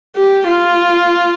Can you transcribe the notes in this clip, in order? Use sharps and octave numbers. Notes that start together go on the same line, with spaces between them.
G4
F4